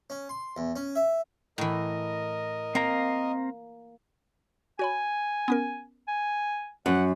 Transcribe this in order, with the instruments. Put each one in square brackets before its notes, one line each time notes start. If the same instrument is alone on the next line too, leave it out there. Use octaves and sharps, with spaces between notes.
[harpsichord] C#4
C6
E2
C#4
E5
[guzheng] A2 E3 [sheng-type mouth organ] A#4 D#5
[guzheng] A#3 [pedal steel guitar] C4 F5 A#5
[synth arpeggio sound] F#4 C#5 B5 [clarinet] G#5
[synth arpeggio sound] B3 C#4 A#4
[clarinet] G#5
[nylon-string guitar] F#2 [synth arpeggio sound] F3 [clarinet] F#5